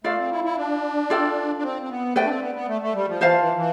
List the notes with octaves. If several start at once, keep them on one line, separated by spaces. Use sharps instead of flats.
A3 F4 A4 D5 F5
C4
E4
E4
D4
F4 A4 D5 G5
D4
C4
C4
B3
A3 B4 D5 G5
D4
C4
B3
B3
A3
A3
G3
F3
E3 F4 C5 F5 A5
E3
E3